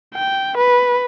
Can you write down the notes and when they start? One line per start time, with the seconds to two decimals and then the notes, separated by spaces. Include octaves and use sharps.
0.14 G5
0.58 B4